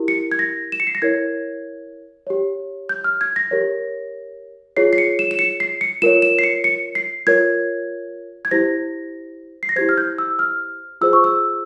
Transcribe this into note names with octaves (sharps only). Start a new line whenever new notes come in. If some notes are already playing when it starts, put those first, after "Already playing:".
Already playing: E4 G4 A#4
C#7
G#6
A#6
E7
C#7
C7
A#6
E4 A#4 C#5 G#6
G4 C#5
G6
F6
G#6
A#6
G4 A#4 C#5
F4 G#4 C#5 C7
C7
C#7
E7
E7
C#7
C7
C#7
F4 A#4 C#5 E7
E7
C7
C#7
C#7
C7
F4 A#4 C#5 G#6
G#6
E4 G4 C5 A#6
C7
A#6
E4 G4 C5 G#6
F6
G6
E6
F6
F4 G#4 C5 E6
C#6
E6